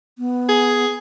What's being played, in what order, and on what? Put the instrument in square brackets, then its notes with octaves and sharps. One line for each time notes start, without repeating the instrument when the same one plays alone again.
[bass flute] B3
[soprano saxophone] G#4